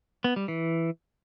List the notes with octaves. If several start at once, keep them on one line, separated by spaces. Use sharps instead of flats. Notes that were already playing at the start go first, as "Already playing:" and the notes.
B3
G3
E3